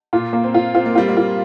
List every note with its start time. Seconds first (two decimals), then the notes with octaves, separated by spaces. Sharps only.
0.13 A#2 F4
0.33 A#3
0.44 C4
0.54 F4
0.75 C4 F4
0.86 A#3
0.95 G3 F4
1.09 A#3
1.17 F4